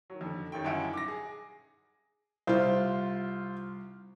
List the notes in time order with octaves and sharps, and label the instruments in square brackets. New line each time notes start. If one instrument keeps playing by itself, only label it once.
[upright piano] D#3 F#3
F2 D3
A1 D#2 D#3 G5
G1 F#2 D#4 E4 F#5 D7
D6 A#6
G#4
[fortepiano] C2 [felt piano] F4 C5